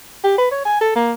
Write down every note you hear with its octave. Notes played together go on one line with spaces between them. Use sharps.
G4
B4
C#5
G#5
A4
A#3